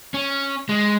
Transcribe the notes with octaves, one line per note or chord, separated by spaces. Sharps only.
C#4
G#3